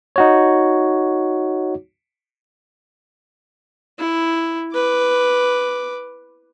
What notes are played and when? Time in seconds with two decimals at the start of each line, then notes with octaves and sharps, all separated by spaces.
0.16 D#4 F#4 C#5
3.99 E4
4.74 B4 D6